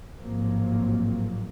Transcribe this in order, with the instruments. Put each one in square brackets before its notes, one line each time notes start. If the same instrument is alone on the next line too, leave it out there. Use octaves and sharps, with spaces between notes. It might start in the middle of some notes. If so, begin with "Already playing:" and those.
[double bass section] A1 G#2 F3 F#3 A#3 C4